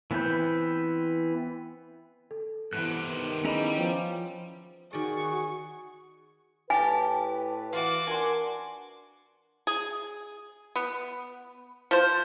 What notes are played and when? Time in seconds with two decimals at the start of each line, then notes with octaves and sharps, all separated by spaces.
0.11 E3 B3 C4 B4 G6
2.31 A4
2.73 G2 C3 E3 B3 F#6
3.10 D#3 B3
3.45 G3 C#4 E4 G#4 D#5 A#5 B5
3.77 F3 C#5 G5
4.93 D#3 F#4 G#4 D5 C#6
6.70 A2 G4 B4 G#5 A5
7.73 E3 F4 F#4 D5 D6
8.07 D4 A#4 G#5 C6
9.67 G#4
10.76 B3
11.91 F3 C5